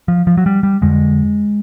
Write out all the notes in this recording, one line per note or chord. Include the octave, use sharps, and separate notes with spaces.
F3
F3
F#3
G3
G3
F2 D3 G#3